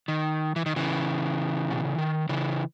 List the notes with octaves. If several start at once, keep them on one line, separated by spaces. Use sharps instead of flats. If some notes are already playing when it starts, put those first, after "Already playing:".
D#3
E3
D#3
C#3 E3
B2
C#3
D#3
C#3 E3